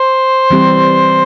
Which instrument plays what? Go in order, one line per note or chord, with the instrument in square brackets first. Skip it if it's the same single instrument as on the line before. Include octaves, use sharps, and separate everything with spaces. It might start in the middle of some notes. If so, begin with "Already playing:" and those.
Already playing: [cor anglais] C5
[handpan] E3 G3 C4 G4